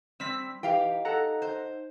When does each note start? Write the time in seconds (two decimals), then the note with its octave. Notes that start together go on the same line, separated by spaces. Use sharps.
0.20 G3 C4 E6 B6
0.63 E3 D#4 G4 F5 G5
1.05 A4 F#5 A#5
1.42 C5